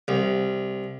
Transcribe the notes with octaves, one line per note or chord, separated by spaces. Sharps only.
C2